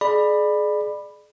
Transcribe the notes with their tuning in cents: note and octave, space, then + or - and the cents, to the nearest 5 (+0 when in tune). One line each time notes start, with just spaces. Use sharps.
G#4 +30 D5 +25 B5 +0